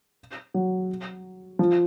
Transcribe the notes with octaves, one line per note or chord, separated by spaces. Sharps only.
F#3
F3